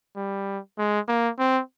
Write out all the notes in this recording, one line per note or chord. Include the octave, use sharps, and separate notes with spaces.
G3
G#3
A#3
C4